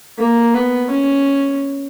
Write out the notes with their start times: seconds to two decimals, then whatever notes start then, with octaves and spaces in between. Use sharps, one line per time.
0.18 A#3
0.54 B3
0.90 C#4